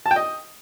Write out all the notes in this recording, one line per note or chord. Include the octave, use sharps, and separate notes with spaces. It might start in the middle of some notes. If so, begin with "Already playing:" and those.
A5
G5
D#5